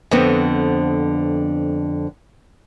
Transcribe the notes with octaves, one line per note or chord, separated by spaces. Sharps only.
F2 D3 B3 C4